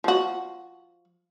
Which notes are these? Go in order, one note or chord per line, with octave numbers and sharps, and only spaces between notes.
F3 F#4